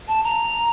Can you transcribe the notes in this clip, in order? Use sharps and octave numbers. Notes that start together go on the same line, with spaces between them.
A5
A#5